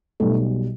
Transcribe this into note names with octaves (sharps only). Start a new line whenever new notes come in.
B1 B2 G3 A3